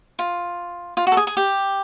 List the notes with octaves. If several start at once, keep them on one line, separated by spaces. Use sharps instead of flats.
F4
F4
F#4
A4
G#4
G#4
G4